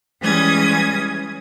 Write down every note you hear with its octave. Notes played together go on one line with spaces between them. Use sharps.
E3 G3 G#3 C#4 D#6 G#6